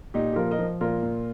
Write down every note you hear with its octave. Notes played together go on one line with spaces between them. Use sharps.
A#2 D#4 G4
G4
F3 F4 A#4
A#4 D#5
F3
A#2 F4 A#4
A#2